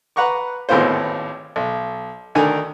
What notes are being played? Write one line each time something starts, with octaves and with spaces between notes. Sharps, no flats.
B4 F#5 A#5 C#6 D6
G#1 D#2 A2 B3 F4 C5
B1
D2 D3 D#3 A#4 G#5